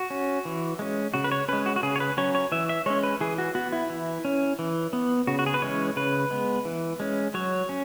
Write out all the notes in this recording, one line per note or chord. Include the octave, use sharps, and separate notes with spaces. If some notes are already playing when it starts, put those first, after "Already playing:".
Already playing: F#4
C#4
E3
G#3 C#4
C#3 F#4
B4
C#5
G#3 C#4 B4
F#4
F#4
C#3 G#4
C#5
B4
F#3 C#4 C#5
C#5
E3 E5
E5
G#3 C#4 C#5
B4
E3 G#4
F#4
B3 F#4
E4
E3
C#4
E3
B3
C#3 F#4
F#4
G#4
B4
E3 G#3 C#4 C#5
C#3 B4
G#3 B3
E3
G#3 C#4
F#3 C#5
C#4